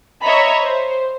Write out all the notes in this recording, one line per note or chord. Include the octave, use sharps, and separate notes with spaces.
C#5 D#5 E5 A#5 B5 C#6
C5